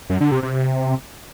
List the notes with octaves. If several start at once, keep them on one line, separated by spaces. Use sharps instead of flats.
F#2
D3
C3
C3